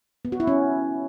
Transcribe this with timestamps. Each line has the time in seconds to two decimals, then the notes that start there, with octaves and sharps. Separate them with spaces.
0.25 B3
0.32 F#4
0.40 E4
0.47 C#4